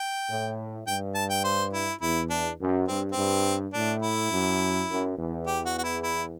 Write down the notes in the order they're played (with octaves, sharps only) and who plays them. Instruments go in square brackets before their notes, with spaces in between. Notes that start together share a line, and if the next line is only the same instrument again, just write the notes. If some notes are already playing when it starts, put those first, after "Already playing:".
Already playing: [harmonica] G5
[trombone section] A2
[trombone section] G2 [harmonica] G5
[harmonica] A5
G5
C5
E4
[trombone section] E2 [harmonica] E4
[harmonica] D4
[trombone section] F#2
[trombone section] G2 [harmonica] C4
[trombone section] G2 [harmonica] C4
[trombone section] A2 [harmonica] D4
[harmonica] E4
[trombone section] F#2
F#2
E2
[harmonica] G4
F#4
F#4
E4
E4